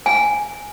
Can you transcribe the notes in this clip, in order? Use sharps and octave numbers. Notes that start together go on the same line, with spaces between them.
G#5